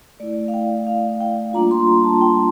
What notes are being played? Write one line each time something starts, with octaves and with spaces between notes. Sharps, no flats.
A3 E4 D5
F5
G5
F5
G5
G3 A#3 D4 F4 A#5
C6
A#5
A5
G5